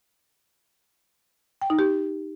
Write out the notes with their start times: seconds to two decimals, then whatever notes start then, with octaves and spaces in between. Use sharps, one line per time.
1.62 G5
1.70 D#4
1.79 G4